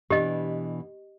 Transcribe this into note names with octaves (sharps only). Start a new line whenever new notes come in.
B2 E3 D4 G4 D#5